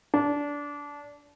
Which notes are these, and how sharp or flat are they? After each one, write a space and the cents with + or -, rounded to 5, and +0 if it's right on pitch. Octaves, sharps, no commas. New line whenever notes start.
D4 -20